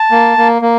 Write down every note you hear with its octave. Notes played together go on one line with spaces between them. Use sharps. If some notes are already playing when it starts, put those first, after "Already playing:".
Already playing: A5
A#3
A#3
A#3